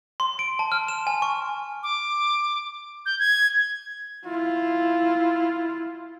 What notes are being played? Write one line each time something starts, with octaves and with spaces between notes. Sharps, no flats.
C6
D7
A5
F6
E7
G#5
C#6
D6
G6
G#6
E4 F4